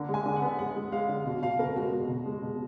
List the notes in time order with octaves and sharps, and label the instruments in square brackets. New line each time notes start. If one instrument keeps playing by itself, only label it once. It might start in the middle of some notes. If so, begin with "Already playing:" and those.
Already playing: [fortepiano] D3 A#3
G#3
[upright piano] G#5
[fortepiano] D3
[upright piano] F#5
[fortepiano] B3
[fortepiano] G#3 [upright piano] F#5
[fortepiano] G#3
[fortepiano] G#3 [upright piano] F5
[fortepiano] D3
[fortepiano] B2 [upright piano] F#4
[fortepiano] B2 [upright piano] F5
[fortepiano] B2 [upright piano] A#4
[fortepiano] G#3 [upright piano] F#4
[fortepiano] B2
B2
G#3
B2